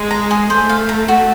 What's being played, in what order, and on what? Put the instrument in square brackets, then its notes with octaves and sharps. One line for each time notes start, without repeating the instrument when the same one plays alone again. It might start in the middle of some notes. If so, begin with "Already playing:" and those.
Already playing: [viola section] G#3
[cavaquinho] A#5
G#4
[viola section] A3 [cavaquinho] C5
[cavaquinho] F5
A#5
F#4